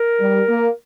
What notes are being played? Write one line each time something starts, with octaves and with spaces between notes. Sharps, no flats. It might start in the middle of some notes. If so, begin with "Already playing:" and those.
Already playing: A#4
G3
A#3